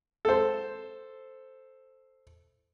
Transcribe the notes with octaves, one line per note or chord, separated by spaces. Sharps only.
A4 C5